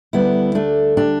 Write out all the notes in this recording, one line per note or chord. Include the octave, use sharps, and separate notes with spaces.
D2 D3 G3 B3 E4
A3 D4
D4 G4